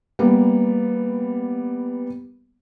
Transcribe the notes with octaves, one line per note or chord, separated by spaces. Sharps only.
G3 A#3 B3